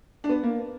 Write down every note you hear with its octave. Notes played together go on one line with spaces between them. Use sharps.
D4
B3
A#3